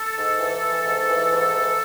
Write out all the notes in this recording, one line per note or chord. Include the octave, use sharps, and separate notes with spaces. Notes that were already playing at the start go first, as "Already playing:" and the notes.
Already playing: A4
G#2
E3
E3
G#2
E3
G#2
E3